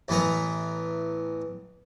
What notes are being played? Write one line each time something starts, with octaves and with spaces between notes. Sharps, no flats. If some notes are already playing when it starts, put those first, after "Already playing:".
A1 E3 B3 B4 A#5